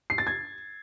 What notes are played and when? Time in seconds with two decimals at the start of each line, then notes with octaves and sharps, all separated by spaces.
0.10 C7
0.18 A6
0.27 G#6